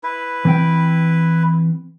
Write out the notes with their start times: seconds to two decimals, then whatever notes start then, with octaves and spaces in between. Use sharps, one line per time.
0.03 E4 B4
0.45 E3 C4 G5